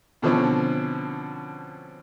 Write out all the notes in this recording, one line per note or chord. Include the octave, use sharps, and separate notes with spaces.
B2 D3 F3 C4 C#4